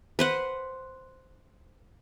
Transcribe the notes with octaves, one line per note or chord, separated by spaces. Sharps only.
B4 C5 F#5